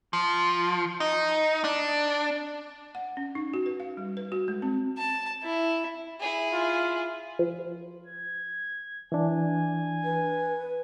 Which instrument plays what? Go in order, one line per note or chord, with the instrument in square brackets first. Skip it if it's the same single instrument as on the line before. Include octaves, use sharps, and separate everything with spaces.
[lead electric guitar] F3
D#4
D4
[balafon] F#5
C#4
D#4
F#4
B4
F5
G3
B4
F#4
G#3
C4
[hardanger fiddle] A5
E4
[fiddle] E4 G#4
[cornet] F4
[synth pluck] F3
[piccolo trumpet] G#6
[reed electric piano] E3 D4 [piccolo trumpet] G#5
[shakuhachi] B4